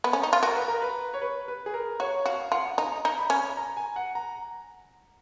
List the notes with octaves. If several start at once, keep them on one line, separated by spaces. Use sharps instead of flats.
B3
C#4
D#4
F4
F#4 A#4
B4
A#4
B4
C#5
B4
B4
G#4
A#4
F#4 C#5
F#4 F5
F4 F#5
D#4 A#5
D#4
B5
C#4
A#5
G#5
F#5
A#5